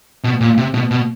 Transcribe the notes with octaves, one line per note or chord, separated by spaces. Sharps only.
B2
A#2
C3
B2
B2